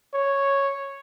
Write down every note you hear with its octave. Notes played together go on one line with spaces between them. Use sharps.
C#5